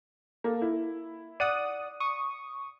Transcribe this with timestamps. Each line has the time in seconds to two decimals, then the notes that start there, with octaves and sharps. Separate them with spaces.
0.44 A#3 A4
0.62 E4
1.40 D5 F#5 D#6 D#7
2.00 C#6 D#6